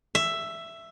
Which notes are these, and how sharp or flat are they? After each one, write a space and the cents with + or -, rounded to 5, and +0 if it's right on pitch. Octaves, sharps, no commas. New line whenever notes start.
E5 +10